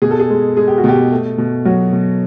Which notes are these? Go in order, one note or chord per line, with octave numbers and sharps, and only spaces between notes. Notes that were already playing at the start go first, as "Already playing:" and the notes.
B2 G#4
A4
G#4
G#3
G#3 G#4
G4
F#4
B2 G4
A3
B2
F#3 F#4
B2